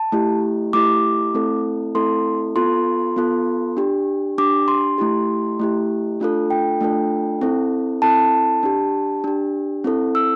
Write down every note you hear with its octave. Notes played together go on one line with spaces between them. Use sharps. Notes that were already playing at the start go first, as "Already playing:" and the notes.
Already playing: A5
A3 E4 G4
A3 E4 G4 D6
A3 C4 E4 A4
A3 C4 E4 A4 C6
B3 F4 A4 C6
B3 F4 A4
D4 G4
D4 G4 D6
C6
A3 E4 G4
A3 E4 G4
A3 D4 F4 A4
G5
A3 D4 F4 A4
C4 E4 A4
C4 E4 A4 A5
D4 G4
D4 G4
C4 E4 A4
E6